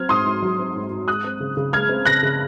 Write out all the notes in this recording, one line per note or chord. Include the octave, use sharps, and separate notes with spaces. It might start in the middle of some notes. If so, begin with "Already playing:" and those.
Already playing: F#3 C4 F6 G#6
G#2 C6 D#6
G#2
F#3
C4
G#2
G#2
G#3 D#6 F#6
C4
C#3
C#3
G#3 F6 G#6
C4
C#3 F#6 A#6
C#3